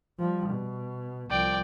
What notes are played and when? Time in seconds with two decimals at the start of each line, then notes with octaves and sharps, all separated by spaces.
0.19 F3 G3
0.50 B2
1.30 C2 F3 D5 G5